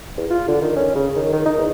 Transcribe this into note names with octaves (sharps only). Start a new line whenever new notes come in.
E2
F4
D3
D#3
C#4
C#3
D#3
D#3
D#4
E2